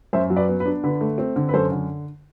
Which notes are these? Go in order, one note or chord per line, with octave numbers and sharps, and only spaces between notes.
F#2 C5 E5
F#3
B4 D5
B3
B4
D4
D3 B4
A3
C4
D3
B4
F#2 A4 C5
D3